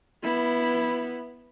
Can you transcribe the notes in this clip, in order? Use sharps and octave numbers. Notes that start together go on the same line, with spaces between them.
B3 E4